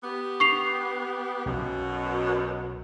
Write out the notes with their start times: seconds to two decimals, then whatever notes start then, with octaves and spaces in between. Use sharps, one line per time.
0.04 B3 G4
0.40 C#6 C7 F7
1.46 B1 F#2 B2 F#3